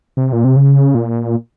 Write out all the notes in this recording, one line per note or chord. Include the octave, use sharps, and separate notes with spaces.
C3
A#2
C3
C#3
A#2